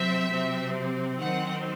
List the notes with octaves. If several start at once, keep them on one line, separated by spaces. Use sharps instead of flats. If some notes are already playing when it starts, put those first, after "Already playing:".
Already playing: C3 F#3 C4 E5
C3 F#3 C4
D#3 F#3 C4 F#5